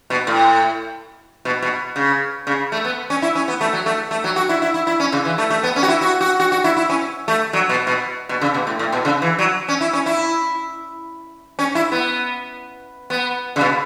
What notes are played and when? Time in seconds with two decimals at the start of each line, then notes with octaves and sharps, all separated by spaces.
0.10 B2
0.27 A2
1.45 B2
1.62 B2
1.96 C#3
2.47 C#3
2.72 A3
2.85 B3
3.10 C#4
3.22 E4
3.35 C#4
3.48 B3
3.61 A3
3.73 F#3
3.86 A3
4.11 A3
4.24 F#3
4.36 F#4
4.49 E4
4.62 E4
4.74 E4
4.87 E4
5.00 C#4
5.12 C#3
5.25 E3
5.38 A3
5.50 A3
5.63 B3
5.76 C#4
5.83 F#4
5.88 E4
6.01 F#4
6.21 F#4
6.40 F#4
6.52 F#4
6.64 E4
6.77 E4
6.89 C#4
7.28 A3
7.53 F#3
7.69 B2
7.87 B2
8.29 B2
8.41 C#3
8.54 B2
8.67 A2
8.79 A2
8.92 B2
9.05 C#3
9.22 E3
9.39 F#3
9.68 C#4
9.81 E4
9.93 C#4
10.06 E4
11.59 C#4
11.75 E4
11.92 B3
13.10 B3
13.56 C#3
13.61 B2